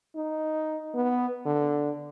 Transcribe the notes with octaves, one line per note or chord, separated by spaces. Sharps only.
D#4
B3
D3